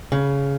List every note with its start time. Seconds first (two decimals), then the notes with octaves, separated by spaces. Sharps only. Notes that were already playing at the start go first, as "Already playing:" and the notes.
0.12 C#3